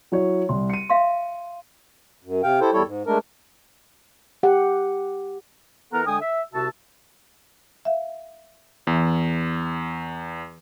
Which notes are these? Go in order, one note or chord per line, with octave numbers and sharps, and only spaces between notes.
F#3 E4 C#5
C2 C6
C#7 D#7
E5 F5 C6
F#2
C3 F5 G5
E4 G4 A4 C5
E2 G3 E4 A4 C#5
G#2
G#3 A3 D4 A#4
G4 F#5
E3 B3 A4 A#4 F#5 A#5
D3 G#3 G5 G#5 D#6
E5
C2 C3 F#4 E5 A5
E5 F5
E2 E3